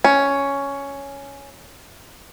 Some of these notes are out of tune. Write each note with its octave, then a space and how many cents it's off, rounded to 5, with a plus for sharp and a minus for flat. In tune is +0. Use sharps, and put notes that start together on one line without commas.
C#4 +5